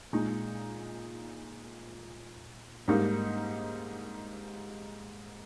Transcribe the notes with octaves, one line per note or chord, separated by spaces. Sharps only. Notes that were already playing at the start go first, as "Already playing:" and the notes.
A#2 G#3 D#4
G#2 G3 A#3 D#4